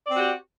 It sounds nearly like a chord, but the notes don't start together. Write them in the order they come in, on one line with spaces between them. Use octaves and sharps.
D5 C4 F#4 G4